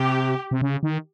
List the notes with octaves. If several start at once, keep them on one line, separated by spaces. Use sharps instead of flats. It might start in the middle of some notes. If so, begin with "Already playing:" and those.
Already playing: C3 G4
C3
C#3
D#3